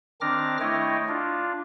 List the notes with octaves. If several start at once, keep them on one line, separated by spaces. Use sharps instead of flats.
D#3 C4 D4 D6 F6 A#6
A3 E4 C#5 D#5 G5
D4 F4